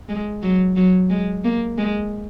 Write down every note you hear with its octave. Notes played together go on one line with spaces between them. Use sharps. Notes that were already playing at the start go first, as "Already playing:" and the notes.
G#3
F#3
F#3
G#3
A#3
G#3